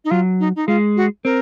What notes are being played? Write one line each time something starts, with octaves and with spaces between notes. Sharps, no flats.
D#4
F#3 F4
D#4
D#4
G#3 F4
F#4
C4 A#4